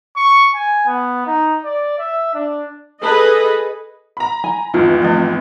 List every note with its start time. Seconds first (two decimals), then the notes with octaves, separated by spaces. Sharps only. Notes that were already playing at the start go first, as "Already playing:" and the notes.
0.16 C#6
0.55 G#5
0.87 B3
1.27 D#4
1.64 D5
1.99 E5
2.34 D4
3.03 G#4 A4 B4 D#5
4.17 A#5 B5
4.44 G#5
4.74 G#1 E2 F4
5.02 F3 A3 C4